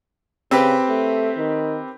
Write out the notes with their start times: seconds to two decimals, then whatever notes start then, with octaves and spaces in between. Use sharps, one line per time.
0.51 C#3 C4 G4 B4
0.89 A3
1.37 D#3